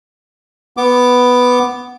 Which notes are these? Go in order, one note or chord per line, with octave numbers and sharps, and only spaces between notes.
B3 D6